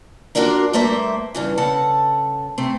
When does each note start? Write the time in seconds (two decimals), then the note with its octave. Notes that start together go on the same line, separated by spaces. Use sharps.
0.35 A#3 D4 F4 F#4 G#4 A#4
0.73 G2 A3 A#3 C5 E5
1.35 G2 C#3 E3
1.58 C#3 A4 F#5 A5
2.58 C3 A3 C4